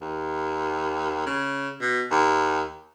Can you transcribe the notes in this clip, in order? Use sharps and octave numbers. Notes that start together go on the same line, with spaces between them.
D#2
C#3
B2
D#2